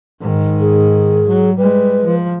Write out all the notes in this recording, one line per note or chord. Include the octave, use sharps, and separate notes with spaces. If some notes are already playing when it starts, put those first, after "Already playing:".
G#2 D#3
G#4
F#3
G3 G#3 B4
F3